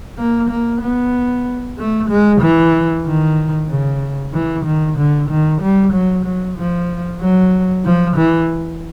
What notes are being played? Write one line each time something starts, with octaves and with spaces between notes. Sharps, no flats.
A#3
A#3
B3
A3
G#3
E3
D#3
C#3
E3
D#3
D3
D#3
G3
F#3
F#3
F3
F#3
F3
E3